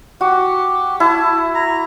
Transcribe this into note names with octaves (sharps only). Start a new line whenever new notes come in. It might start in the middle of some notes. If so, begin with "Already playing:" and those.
F#4 G4
E4 A5
A#5